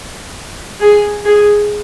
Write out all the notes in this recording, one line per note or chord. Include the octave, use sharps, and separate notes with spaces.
G#4
G#4